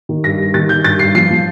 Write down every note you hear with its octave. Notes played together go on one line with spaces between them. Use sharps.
D#3
G2 A#6
G2
D#3 A6
D#3 G6
G2 A6
G2 C7
F3 C7
F3